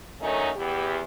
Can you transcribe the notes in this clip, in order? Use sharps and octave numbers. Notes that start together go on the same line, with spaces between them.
D3 D#3 F#3 A3 C#4 D#4
E2 G4